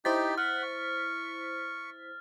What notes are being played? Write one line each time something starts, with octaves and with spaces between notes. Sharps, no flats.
D#4 E4 G4 C5 A6 B6
F#5 F6
C#6